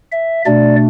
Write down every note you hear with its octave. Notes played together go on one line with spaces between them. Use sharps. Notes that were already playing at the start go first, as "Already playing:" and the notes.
E5
B2 A3 D4 D5